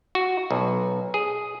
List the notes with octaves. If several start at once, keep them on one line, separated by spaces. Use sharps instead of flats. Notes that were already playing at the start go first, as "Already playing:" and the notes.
F#4
B1
G#4